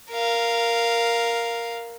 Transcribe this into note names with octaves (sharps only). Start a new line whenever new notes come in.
A#4 F5